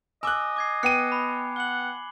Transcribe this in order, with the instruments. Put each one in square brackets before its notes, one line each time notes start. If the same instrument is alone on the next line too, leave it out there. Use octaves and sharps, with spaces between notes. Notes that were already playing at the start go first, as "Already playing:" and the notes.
[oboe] D#5 [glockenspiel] G#5 D6 G7 [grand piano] E6 F#6
[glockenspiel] D6 G#6 C7
[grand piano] B3 G5 D#7 [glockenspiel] F#6 C7 C#7
[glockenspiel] B5
[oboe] F#5 [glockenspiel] F#7 G7